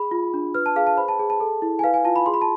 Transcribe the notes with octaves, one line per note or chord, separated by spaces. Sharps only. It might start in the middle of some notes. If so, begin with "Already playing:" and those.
Already playing: G#4 B5
F4
D4
B4 F6
A5
G#4 F5
A5
C5 B5
A5
G#4
A5
A4
E4
G#5
B4 F5
G#5
F4 A5
B5
G#4 C6
B5
A5